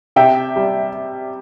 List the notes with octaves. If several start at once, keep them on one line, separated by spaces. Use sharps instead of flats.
C3 E5 G5
G3